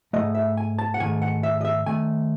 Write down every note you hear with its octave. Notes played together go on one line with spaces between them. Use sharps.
G#2 D#3 A3 D#5
E5
G#5
A5
F#5
G#2 D#3 A3 G#5
F#5
E5
D#5
E5
D#3 A3 G#5